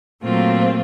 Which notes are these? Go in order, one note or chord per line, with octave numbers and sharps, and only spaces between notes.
A#2 F#3 A3 C4 F4